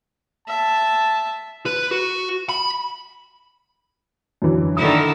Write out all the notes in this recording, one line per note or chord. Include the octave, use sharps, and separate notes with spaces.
E5 A5
B4
F#4
B5
F#2 D3 E3
D3 D#3 E4 D#6